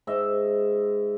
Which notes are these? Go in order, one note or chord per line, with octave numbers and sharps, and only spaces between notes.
G#2 D#5 E5